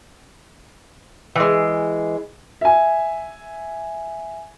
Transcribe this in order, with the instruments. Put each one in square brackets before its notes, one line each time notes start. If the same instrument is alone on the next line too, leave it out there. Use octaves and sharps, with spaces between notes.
[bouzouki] E3 G#3
[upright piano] E5 G#5